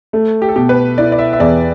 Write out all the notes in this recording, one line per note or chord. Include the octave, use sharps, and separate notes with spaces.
A3
G4
A4
B2 G4
B4
E4 D5
D5
E5
E5
E2 D5